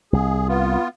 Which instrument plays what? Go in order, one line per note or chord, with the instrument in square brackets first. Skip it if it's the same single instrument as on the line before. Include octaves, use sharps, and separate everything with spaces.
[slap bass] C2 [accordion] G#4
[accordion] B3 F4